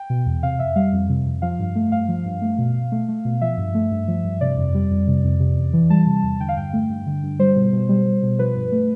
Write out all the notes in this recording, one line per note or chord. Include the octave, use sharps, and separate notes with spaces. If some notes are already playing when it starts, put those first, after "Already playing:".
Already playing: G5
B2
E2
C3 F5
F2 E5
G3 F5
F2
C3
F2
F3 F5
G2
A3
G2 F5
F3
G2
A3
B2
B2
A3
A3
B2
F3 E5
G2
A3
G2
F3
G2
C3 D5
F2
G3
F2
C3
F2
C3
E2
E3
G3 A5
C3
E2
D3 G5
F5
G2 G5
A3
G2
D3
G2
G3 C5
B2
B2
G3
G3
B2
F3 B4
G2
A3